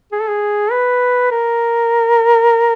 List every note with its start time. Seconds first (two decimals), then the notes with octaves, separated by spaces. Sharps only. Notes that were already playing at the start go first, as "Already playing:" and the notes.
0.12 G#4
0.20 A4
0.28 G#4
0.71 B4
1.31 A#4